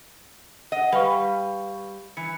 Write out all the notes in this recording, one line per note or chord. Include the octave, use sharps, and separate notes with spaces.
D#5 F#5
G3 B4 F5 C#6
E3 C#7